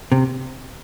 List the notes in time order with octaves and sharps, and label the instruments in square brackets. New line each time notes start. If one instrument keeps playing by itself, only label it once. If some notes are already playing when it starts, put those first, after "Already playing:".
[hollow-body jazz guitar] C3